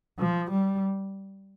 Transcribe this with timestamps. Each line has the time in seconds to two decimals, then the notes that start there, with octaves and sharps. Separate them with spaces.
0.19 F3
0.51 G3